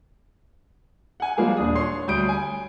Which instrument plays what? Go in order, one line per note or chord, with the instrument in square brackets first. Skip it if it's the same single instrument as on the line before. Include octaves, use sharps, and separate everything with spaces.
[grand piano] F#5 G#5
F3 G3 G#3 A#3 G#4
D#1 D4 D#6
C#5 C6 C#6 C7
D2 G3 D#6 G6 D7
C#5 G#5